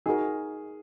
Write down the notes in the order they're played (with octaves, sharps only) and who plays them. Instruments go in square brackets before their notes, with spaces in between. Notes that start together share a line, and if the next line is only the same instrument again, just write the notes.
[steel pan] D#4 F#4 A#4 [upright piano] G#4